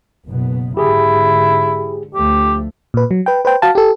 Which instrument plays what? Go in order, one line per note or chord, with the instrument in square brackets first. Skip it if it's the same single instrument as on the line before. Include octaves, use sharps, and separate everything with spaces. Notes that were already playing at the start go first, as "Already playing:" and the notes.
[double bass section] F#1 B2 B3
[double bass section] G#2 D3 [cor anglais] E4 [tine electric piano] G4 G#4
[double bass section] D2 F3 A3 [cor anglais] G4
[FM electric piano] A#2 B4
F#3
B4 G5
B4 C5 G5
F#4 F5 A5
G4 A4